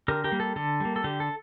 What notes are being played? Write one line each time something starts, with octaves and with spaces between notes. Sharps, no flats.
D3 G4 A#4
G4 A#4
G3 A#3
A4
D3 A4
G3 A#3
A4
D3 G4
A4